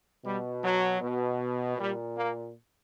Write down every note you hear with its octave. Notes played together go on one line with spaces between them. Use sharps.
B2 G3
F#3
B2
A#2 G3
A#3